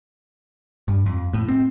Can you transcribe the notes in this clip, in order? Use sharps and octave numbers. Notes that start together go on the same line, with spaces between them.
G2
F2
A2
C4